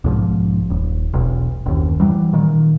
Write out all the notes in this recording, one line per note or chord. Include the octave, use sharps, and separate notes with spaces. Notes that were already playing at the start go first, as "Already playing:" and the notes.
B1 G#2 F3
D#1
E1 B1
F#1 D#2
E3 F#3 G3
A#2 D#3